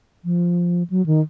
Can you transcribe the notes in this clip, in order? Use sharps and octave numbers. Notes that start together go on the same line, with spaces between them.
F3
F#3
D#3